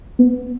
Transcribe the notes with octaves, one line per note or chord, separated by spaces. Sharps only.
B3